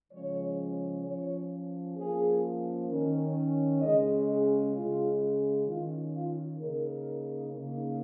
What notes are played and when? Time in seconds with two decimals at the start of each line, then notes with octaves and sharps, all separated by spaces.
0.12 C#3 F3 G#3 C#4 C#5
1.04 F3 C#4 C#5
1.97 F3 A#3 C#4 G#4
2.89 D#3 C#4 A#4
3.82 C#3 G#3 C#4 D#5
4.28 G#4
4.74 C#3 G#3 C#4 F4
5.66 D#3 C#4 F4
6.13 F4
6.59 C#3 A#3 D#4 A#4
7.52 C#3 A#3 D#4